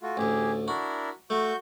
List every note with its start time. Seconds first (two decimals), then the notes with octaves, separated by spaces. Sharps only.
0.02 A3 F4 F#4
0.17 A1 D2 G4 G#4
0.68 D4 E4 F#4 A#4
1.30 A3 F#4 C#6 G6